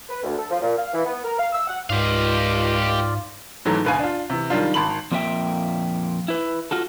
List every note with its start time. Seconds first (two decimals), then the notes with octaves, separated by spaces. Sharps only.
0.09 B4
0.23 D2
0.38 A4
0.51 F3
0.62 A#2
0.77 F5
0.93 E3
1.05 B3
1.24 A#4
1.38 F5
1.53 E6
1.68 F#5
1.90 C#2 G#2 F4 G4 D5 F5
3.65 G#2 E3 F#3 A3
3.85 D2 B2 B4 F5 G#5
3.99 D4 F4
4.30 C3 E3
4.50 D#3 F#3 G3 D4 F4
4.74 G#1 A5 B5 C6 F#7
5.11 F2 A#2 A#3 C4 E5 G5
6.28 E4 B4
6.71 F4 F#4 A4